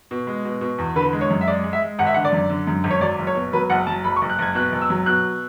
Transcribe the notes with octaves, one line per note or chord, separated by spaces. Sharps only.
B2
G#3
B2
B2
E2
D3 B4
G#3
C#5
F#2
E5
G#3 D5
G#3
E5
G#3
G#1 F#5
E5
D3 F#5
D5
F#2
D3
F#2
G#1
C#5
F#3 D5
F#1
C#5
B2
F#3 B4
F#1 F#5
F#3 A5
F#1 B5
C#6
F#1
F#6
F#1 G#6
B2 F#6
F#1
E6
F#3
B2 F#6